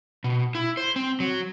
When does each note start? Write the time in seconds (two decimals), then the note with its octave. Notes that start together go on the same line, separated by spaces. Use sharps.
0.24 B2
0.55 E4
0.77 C5
0.96 C4
1.20 F#3